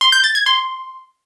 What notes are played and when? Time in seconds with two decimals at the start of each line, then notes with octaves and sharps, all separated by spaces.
0.01 C6
0.12 G6
0.24 A6
0.35 G#6
0.46 C6